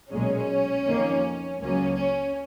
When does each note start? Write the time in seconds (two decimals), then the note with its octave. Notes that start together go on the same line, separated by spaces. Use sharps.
0.12 B1 A#2 G#3 C#4
0.86 F2 D#3 A#3
1.60 C#2 C#3 F#3 A#3 C#4
1.96 C#4